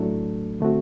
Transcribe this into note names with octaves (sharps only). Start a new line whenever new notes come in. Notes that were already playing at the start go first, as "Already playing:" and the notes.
Already playing: A2 F#3 A3 D4 A4
D3 A3 C4 F#4